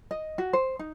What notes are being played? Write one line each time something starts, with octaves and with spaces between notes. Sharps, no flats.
D#5
F#4
C5
D#4